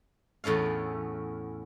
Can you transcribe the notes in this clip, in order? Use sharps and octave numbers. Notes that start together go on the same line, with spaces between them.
E2 A2 A3 C#4 F5